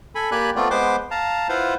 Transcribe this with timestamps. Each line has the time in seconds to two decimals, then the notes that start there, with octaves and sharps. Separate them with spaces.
0.15 A4 G#5 B5
0.31 A#3 G4 D5 G#5 B5 F#6
0.56 A3 B3 C4 F4 D5
0.70 G#3 B3 B4 C5 C6 D6
1.11 F5 A5 A#5
1.49 E4 F4 B4 C5 F5 F#5